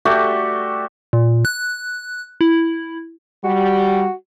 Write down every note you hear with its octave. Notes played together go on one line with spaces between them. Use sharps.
A3 F#4 G4 D5
A#2
F#6
E4
G3 F#4